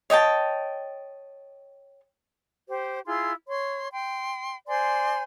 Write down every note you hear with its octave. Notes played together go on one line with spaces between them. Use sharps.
C#5 D#5 G5 A5
G4 C5
E4 F4 G#4 C6
C#5 C6
G5 C6
C5 D5 G#5 C6